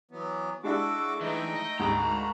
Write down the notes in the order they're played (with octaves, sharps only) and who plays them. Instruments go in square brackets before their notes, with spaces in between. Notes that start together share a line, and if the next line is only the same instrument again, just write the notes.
[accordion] E3 F#3 B3
[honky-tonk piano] G#3 D4 E4 [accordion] F#4 A4 D6
[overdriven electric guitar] E3 [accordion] A3 D#4 G5
[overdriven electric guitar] D#5
[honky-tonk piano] D2 G#2 [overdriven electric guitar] A#5 B5
[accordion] A#3 F#4